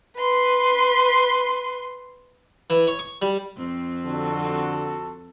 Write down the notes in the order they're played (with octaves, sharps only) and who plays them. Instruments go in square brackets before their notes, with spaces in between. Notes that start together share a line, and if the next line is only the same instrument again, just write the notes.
[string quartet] B4 C6
[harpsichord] E3
C#5
C#6
G3
[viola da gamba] F2 C4
[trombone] D3 [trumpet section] F#4 A4